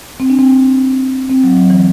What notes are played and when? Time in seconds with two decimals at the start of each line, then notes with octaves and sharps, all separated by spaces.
0.20 C4
0.30 D4
0.39 C4
1.30 C4
1.44 F#3
1.57 F#3
1.70 E3